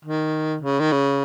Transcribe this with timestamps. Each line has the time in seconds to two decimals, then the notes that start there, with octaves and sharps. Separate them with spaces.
0.05 D#3
0.62 C#3
0.80 D#3
0.92 C#3